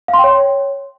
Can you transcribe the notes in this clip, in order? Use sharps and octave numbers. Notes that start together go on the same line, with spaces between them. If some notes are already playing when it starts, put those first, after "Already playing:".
F5
C6
G5
C#5